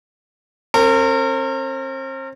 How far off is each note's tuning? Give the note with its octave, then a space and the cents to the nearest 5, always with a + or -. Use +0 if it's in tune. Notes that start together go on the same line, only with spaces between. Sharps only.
C4 +40 A#4 -35